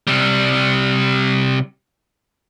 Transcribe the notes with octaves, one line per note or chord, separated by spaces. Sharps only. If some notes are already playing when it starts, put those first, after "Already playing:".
C3 G3